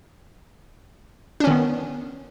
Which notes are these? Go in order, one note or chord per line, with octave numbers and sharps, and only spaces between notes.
D#3 B3 C#4 D4